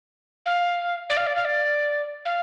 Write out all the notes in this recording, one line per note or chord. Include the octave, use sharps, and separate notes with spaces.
F5
D5
F5
D5
F5
D5
F5